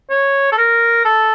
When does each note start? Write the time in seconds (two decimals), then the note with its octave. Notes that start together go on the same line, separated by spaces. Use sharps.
0.10 C#5
0.52 A4
0.58 A#4
1.05 A4